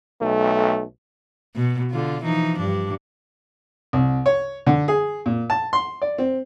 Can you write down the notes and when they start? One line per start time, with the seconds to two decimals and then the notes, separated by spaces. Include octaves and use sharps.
0.21 B1 A3
1.56 B2
1.91 D3 F4
2.22 E3 F3 D#4
2.59 G2 D4
3.93 C2
4.26 C#5
4.67 D3
4.88 G#4
5.26 A#2
5.50 A5
5.73 C6
6.02 D5
6.18 C4